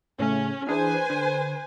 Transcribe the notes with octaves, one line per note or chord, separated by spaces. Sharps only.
A2 C#3 A3 C#4
E3 D4 G#4 B4 C5 G#5
D3